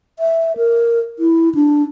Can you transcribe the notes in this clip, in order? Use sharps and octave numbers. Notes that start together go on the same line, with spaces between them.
E5
A#4
E4
D4